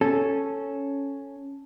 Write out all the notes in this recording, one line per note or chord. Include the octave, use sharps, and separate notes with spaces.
C#4 A4